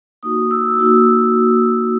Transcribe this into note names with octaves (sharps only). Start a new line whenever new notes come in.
A#3 D#4 F#4 D#6
E6
A#3 D#4 F#4